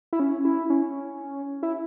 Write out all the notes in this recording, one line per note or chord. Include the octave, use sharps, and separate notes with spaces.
E4
C#4
E4
C#4
E4